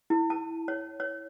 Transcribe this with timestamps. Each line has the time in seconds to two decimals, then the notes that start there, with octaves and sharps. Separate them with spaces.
0.10 E4
0.30 A5
0.68 C#5
1.00 C#5